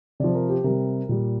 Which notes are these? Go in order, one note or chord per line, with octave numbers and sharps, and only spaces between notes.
C3 F3 D5
A#4
G4
C3 G3 A#4
A#2 G3